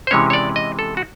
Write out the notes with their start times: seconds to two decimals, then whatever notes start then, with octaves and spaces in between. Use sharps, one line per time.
0.07 C5
0.11 C3 E3 G#3 C#4 C#5
0.30 C#5
0.33 D5
0.56 D#5
0.79 A4
0.97 F#4